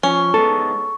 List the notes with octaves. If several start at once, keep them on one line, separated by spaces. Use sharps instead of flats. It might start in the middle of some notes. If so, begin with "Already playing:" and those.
F3 C#4 C#6
G#3 B3 D#4 A4